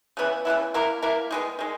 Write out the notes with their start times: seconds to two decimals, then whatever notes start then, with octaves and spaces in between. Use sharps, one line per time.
0.17 C#3 E3 B3 E4
0.45 C#3 E3 B3 E4
0.74 A#3 E4 A#4
1.02 A#3 E4 A#4
1.31 D#3 G#3 B3
1.59 D#3 G#3